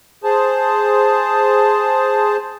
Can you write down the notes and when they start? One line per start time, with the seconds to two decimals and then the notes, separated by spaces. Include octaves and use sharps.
0.24 G#4 C5 A5